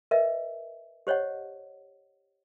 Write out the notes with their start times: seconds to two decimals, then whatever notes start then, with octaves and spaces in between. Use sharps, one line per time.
0.11 A#4 B4 D#5 E5
1.07 G4 C5 C#5 D#5 F#5